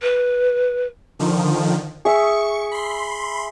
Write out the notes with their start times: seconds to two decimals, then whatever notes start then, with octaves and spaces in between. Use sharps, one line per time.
0.02 B4
1.19 D3 D#3 F3
2.05 G#4 E5 C#6 C#7
2.72 B5 C6